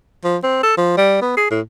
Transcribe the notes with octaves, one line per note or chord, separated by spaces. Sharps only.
F3
C4
A4
F3
G3
B3
G#4
A2